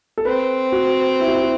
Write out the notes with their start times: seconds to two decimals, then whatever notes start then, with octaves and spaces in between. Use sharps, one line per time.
0.18 A4
0.25 C4 B4
0.72 F#4
1.20 E4
1.27 F#4
1.35 E4
1.43 F#4